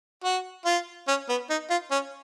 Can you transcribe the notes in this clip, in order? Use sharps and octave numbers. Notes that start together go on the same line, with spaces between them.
F#4
F4
C#4
B3
D#4
F4
C#4